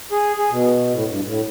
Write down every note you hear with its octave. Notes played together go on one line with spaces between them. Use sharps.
G#4
G#4
B2
A2
G2
A2